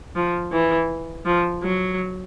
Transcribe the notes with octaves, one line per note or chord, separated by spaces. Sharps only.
F3
E3
F3
F#3